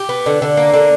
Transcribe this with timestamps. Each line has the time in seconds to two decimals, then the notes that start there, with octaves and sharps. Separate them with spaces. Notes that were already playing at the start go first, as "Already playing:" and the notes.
Already playing: G4
0.09 B3
0.26 D3
0.42 D3
0.57 A#3
0.74 D3